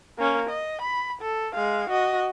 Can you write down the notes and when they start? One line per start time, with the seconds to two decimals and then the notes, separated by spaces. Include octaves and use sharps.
0.18 A#3 C#4
0.49 D#5
0.81 B5
1.21 A4
1.55 G#3 F5
1.90 F#4 D#5